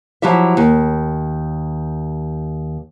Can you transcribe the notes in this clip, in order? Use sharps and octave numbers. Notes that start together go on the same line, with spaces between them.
F3 F#3 E4 G4 E5
D#2